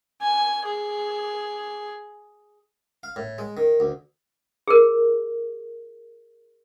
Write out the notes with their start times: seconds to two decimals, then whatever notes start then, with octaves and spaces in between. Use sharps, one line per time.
0.21 G#5
0.65 G#4
3.03 F5
3.16 A2
3.38 G#3
3.57 D#3
3.80 D2
4.68 G#4 A#4